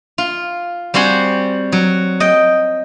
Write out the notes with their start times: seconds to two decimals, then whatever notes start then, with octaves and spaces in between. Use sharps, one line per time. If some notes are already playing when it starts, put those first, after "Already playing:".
0.18 F4
0.94 G3 C4 F#4 C5 G#5
1.72 F#3
2.20 D#5 G5